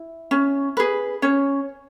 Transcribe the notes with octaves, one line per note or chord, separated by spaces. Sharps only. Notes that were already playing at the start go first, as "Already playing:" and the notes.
Already playing: E4
C#4
G#4 B4
C#4 C#5